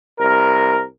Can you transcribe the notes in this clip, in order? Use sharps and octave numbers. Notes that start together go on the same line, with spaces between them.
C2 A#4